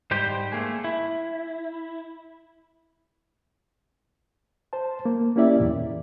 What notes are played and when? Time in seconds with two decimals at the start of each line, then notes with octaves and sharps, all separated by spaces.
0.11 G#2 G3 G4 C5
0.52 A3 A#3 G#4
0.84 E4
4.73 C5 A5
5.05 A#3
5.36 A#3 C#4 E4 G4 D5 E5
5.60 E2 A#2